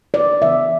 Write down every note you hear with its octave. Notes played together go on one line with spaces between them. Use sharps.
D5
C#3 E3 B3 E5